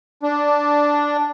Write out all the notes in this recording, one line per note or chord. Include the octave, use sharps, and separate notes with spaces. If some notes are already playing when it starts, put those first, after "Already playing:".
D4